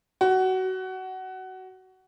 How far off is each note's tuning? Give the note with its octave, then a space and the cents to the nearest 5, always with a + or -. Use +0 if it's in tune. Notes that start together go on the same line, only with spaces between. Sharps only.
F#4 +20